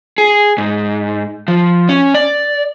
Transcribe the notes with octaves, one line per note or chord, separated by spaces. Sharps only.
G#4
G#2
F3
C#4
D5